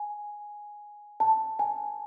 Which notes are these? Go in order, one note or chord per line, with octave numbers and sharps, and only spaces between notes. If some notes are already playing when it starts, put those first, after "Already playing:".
Already playing: G#5
A5
G#5